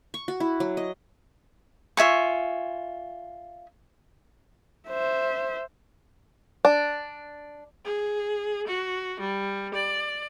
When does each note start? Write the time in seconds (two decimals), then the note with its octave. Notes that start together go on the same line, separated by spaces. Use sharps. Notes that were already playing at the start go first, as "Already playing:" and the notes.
0.14 C#6
0.28 F#4
0.40 E4
0.60 F#3
0.77 D#5
1.97 F4 E5 G#5 C#6
4.89 C5 E5
6.65 D4
7.85 G#4
8.67 F#4
9.20 G3
9.74 D5